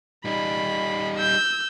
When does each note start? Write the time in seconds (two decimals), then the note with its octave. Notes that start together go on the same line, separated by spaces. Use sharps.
0.25 G3 D#4 B5
1.17 E6 G6